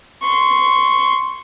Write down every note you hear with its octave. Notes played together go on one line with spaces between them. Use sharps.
C6 C#6